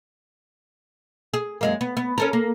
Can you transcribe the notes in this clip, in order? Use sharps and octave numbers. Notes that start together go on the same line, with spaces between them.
G#4
F#2 G#3 A#3
B3
B3
C#4 A4 A#4
A#3